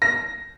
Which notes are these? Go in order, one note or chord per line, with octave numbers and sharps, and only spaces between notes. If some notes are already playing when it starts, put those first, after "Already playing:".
A#6